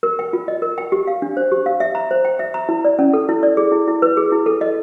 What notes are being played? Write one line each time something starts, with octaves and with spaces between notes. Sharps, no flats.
A#4
G5
F4
D#5
A#4
G5
G4
F5
D4
C5
G4
F5
E5
A#5
C5
G5
E5
A#5
E4
D5
C#4
A4
E4
D5
G#4
E4
E4
B4
G#4
E4
A4
D#5